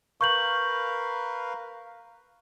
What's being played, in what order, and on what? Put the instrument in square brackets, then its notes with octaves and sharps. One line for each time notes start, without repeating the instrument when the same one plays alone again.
[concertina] A#4 B4 F5 [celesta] C#6 G6 F#7